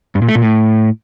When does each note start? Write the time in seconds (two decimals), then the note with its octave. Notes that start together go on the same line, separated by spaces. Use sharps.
0.15 G2
0.22 A#2
0.29 A3
0.35 A#2
0.42 A2